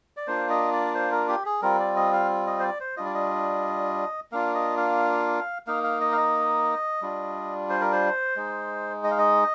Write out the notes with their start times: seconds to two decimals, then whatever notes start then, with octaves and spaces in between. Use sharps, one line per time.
0.17 D5
0.27 A#3 D4 F4 C5
0.50 D#5
0.73 D5
0.95 C5
1.12 A#4
1.28 G4
1.46 G#4
1.62 G3 C4 F4 A#4
1.79 D5
1.96 D#5
2.13 F5
2.47 D#5
2.59 C5
2.63 D5
2.80 C5
2.97 G3 D4 F4 D#5
3.05 D5
3.14 D#5
4.32 A#3 D4 F4 F5
4.55 D#5
4.77 F5
5.67 A#3 D#4 F5
5.83 F5
6.01 D#5
6.12 F5
6.17 D#5
7.02 G3 D4 F4
7.70 C5
7.81 A#4
7.92 C5
8.36 G#3 D#4
9.04 D#5
9.11 F5
9.18 D#5